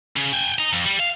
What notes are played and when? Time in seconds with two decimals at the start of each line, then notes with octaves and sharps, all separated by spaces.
0.16 C#3
0.33 G5 G#5
0.59 D#5 A#5
0.73 F2
0.86 G3
0.99 F5